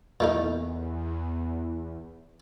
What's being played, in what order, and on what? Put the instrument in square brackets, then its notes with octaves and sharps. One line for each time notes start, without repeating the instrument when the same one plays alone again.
[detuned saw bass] E2 [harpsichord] A#2 A3 D#4